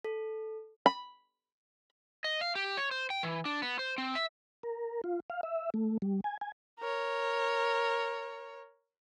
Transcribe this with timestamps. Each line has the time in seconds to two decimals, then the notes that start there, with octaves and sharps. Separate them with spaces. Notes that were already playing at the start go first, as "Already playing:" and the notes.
0.04 A4
0.86 B5
2.24 D#5
2.41 F5
2.55 G4
2.77 C#5
2.91 C5
3.10 G5
3.23 E3
3.45 D4
3.62 B3
3.79 C5
3.98 C4
4.15 E5
4.63 A#4
5.04 F4
5.30 F5
5.43 E5
5.74 A3
6.02 G3
6.24 G#5
6.41 G#5
6.79 A#4 C#5